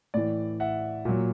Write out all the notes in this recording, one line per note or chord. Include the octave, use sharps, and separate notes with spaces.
A2 E3 D5
E5 F#5
A#2 F#3